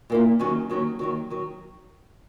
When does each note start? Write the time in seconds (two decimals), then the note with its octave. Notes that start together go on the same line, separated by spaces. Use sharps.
0.10 A#2 A#3 E4
0.39 D#2 D#3 F#3 C#4
0.70 D#2 D#3 F#3 C#4
0.99 D#2 D#3 F#3
1.30 D#3 F#3